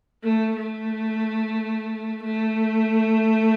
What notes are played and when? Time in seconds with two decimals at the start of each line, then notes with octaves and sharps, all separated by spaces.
0.24 A3
0.57 A3
2.24 A3